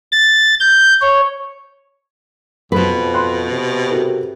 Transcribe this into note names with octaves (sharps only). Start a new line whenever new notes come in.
A6
G6
C#5
F2 B2 B4 C5
B5 C6 F#6
C3
F#4 A4 A#4